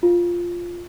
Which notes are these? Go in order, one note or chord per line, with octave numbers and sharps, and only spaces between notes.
F4